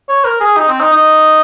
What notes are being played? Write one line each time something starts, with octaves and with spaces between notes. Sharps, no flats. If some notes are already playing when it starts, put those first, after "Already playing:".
C#5
A#4
G#4
D#4
C4
D#4
D#4